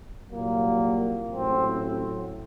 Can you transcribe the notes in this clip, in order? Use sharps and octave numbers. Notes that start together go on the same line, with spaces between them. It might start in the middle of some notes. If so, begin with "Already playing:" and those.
C2 A#2 F#3 A#3
A1 A2 F#3 C4